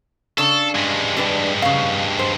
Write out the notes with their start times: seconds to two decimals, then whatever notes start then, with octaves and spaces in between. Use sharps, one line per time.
0.38 C#3 D4 A4 A5
0.75 G2 G#3
1.17 G3 D4 B4
1.62 C#3 F5
2.19 C5